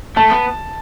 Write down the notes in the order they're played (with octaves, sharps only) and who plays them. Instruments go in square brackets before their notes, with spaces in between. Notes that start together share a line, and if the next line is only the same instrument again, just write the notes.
[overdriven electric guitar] A3 [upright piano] A5
[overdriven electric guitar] B3